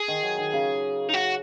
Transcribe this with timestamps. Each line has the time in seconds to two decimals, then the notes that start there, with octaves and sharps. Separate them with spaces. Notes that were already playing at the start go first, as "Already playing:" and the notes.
Already playing: G#4
0.08 D#3
0.23 F#3
0.38 D#3
0.53 C#3
1.09 D#4
1.14 F#4